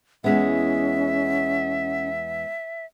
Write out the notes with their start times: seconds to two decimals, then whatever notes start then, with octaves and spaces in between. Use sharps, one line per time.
0.24 E2 G#3 B3 C#4 E5